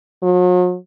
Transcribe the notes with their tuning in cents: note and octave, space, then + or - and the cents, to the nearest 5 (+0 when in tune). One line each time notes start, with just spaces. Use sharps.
F#3 -45